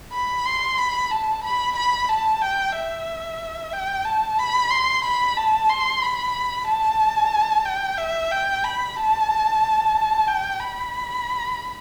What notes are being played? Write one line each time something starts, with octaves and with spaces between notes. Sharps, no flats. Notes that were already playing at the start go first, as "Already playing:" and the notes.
B5
C6
B5
A5
B5
B5
A5
G5
E5
G5
A5
B5
C6
B5
A5
C6
B5
A5
G5
E5
G5
B5
A5
G5
B5